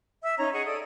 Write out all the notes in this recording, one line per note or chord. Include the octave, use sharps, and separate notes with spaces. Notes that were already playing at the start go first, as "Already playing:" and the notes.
E5 E6
C#4 D#4 C#5 A#5
G#4 D#5 F#5 C#6
A4 D5 D#6